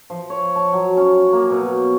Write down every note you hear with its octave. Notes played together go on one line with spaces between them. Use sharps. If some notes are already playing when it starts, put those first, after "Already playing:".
F3
C#5
A5
F#3
C#4
A#3
B2